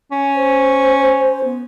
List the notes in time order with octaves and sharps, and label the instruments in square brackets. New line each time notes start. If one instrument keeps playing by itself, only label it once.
[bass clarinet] C#4
[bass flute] C5
B3